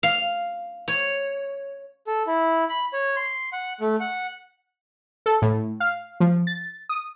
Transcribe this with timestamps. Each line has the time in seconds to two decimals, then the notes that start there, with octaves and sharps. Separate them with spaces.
0.03 F5
0.88 C#5
2.07 A4
2.27 E4
2.69 B5
2.93 C#5
3.16 C6
3.53 F#5
3.81 A3
4.00 F#5
5.26 A4
5.42 A2
5.80 F5
6.20 F3
6.47 A6
6.89 D#6